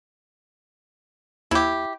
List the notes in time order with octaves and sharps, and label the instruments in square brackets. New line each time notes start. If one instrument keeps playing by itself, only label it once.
[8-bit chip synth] D#2 [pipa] E4 G4